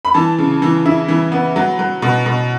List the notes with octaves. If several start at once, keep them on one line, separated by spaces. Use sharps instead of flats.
B5
E3 A5
C#3
E3
E4
E3
B3
F#3
F#3
B2
B2